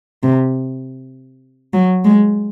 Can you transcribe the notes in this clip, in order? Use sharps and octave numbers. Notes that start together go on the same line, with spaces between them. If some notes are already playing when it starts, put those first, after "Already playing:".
C3
F#3
G#3